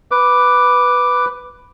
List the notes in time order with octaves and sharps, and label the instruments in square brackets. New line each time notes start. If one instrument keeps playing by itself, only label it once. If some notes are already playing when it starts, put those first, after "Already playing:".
[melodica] B4 [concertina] D6